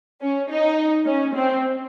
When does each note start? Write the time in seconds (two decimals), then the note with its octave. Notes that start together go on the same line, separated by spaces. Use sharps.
0.21 C#4
0.49 D#4
1.06 C#4
1.35 C4